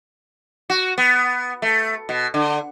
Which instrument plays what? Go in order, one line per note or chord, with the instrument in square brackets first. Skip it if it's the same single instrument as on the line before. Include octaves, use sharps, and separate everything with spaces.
[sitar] F#4
B3
A3
B2
D3